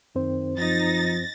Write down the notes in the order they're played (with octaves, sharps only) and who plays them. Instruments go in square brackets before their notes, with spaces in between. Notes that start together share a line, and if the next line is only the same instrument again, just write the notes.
[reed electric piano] F#2 C4 C5 [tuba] D#3
[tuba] F3 [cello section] D#4 [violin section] A6 A#6